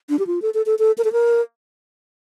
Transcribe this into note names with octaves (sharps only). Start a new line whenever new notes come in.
D4
G4
F4
A4
A4
A4
A4
A#4
A4
A#4